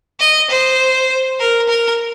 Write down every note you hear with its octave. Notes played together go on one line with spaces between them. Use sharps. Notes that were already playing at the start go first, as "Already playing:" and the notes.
D#5
C5
A#4
A#4